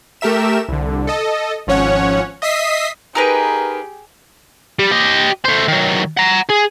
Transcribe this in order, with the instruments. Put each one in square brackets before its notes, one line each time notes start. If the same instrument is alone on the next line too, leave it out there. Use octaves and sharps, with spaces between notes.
[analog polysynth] A3 G4 A#4 E5 E7
C2 D3
A4 D#5
G#1 F3 C#4 C#5 F#5
D#5 E5 D#6 B6 C7
[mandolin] D#4 A#4 B4 [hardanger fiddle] G4 G#4
[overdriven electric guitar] G3
G4 D#5
A3 C5
D#3 F#3
F#5 A#5
G#4